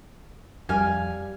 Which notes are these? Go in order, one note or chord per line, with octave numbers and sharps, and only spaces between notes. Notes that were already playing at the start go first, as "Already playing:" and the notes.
F2 G3 F5 G#5